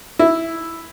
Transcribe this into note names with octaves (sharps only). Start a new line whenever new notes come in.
E4